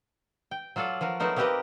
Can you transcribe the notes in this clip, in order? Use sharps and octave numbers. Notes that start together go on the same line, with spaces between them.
G5
F#3 F4 A4 D5
F3 F#4 A#4
F#3 A3 B3 D#4 A#4 C5
A#3 C4 G4 A#4 B4 D#5